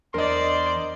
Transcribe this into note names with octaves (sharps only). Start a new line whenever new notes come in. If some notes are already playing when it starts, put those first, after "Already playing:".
E2 E3 D4 A#4 C5 D5 D#5 C6